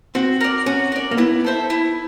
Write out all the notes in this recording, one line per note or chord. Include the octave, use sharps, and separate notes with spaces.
C4 F#4
A#4 D5
C#4 F#4
A#4 D5
A#3
B3 E4
A4 C5 E5
E4